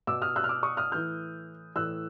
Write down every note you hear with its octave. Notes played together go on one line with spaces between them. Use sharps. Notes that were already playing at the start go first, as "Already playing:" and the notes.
B2 D6 E6
D#6 F6
E6 F#6
F6
D6 E6
C#6 D#6
D#6 F6
A2 E3 F6 G6
A2 E3 E6 F#6